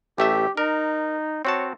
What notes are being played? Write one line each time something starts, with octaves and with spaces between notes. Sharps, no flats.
A1 A3 G4 E5
D#4 A#4
C4 F#4 C#5 A5